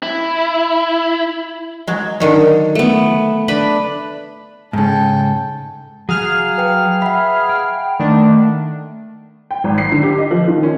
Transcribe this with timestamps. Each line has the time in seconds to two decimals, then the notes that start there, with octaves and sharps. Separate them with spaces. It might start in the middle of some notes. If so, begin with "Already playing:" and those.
0.03 E4
1.87 F#3 G#3
2.20 D3 D#3 F#3
2.75 A3 B3
3.48 D4 B4 B5
4.73 G#2 C#3 A4 G5
6.09 F#3 G#4 F5 F6 F#6
6.58 B4 G5
7.02 E5 F#5 B5
7.49 G5
8.00 D#3 A3 D4
9.51 G5
9.64 G#1
9.78 C7
9.92 D3
10.03 G4
10.18 D#5
10.31 F3
10.48 D#3
10.63 C#4